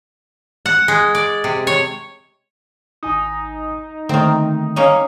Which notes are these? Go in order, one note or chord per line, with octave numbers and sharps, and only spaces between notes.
F#5
G#3
D5
C3
C#5
G#1 D#4 G#5 D#6
D3 D#3 A3 A#3 C4
A#3 C#4 D#4